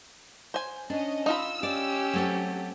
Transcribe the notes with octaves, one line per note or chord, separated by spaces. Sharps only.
C5 G#5
C#4 D4 D#5
D#4 F4 B5 E6
C#4 G4 D5
F#3 A3 C4